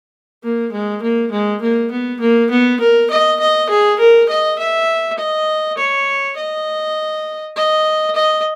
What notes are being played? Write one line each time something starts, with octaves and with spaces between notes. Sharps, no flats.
A#3
G#3
A#3
G#3
A#3
B3
A#3
B3
A#4
D#5
D#5
G#4
A#4
D#5
E5
D#5
C#5
D#5
D#5
D#5